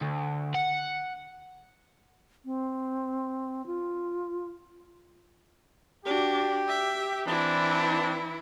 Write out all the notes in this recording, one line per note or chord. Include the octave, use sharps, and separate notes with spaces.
D2
F#5
C4
F4
D4 F#4 G4
E5
E3 C4 D4 E4